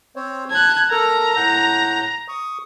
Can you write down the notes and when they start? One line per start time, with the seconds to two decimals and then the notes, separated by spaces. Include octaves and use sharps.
0.16 C4 C5 C#5
0.51 A5 F#6 G#6
0.91 A4 A#4 A#5
1.37 A2 F#5 G6
2.28 C#6 D#6